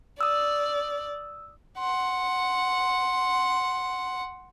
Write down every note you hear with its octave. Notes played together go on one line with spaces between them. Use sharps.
D5 D#6 E6
F#5 C6